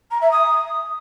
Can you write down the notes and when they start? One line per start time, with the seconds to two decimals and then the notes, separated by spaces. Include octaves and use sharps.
0.11 A#5
0.21 E5
0.31 D#6